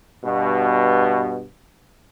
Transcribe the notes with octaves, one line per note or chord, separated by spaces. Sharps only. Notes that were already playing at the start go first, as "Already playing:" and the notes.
G2 B2